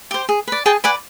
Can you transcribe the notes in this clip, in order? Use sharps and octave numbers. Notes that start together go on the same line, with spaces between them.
G4 C5
G#4
B4 D5
G#4 G5 A5
B4 D5 F#5 G#5